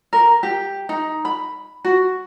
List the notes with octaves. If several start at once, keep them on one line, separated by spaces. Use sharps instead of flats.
A#4
G4
D#4
B5
F#4